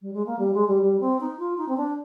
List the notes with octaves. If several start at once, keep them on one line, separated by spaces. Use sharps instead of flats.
G3
G#3
A#3
G3
G#3
G3
G3
C4
D#4
F4
D#4
C4
D4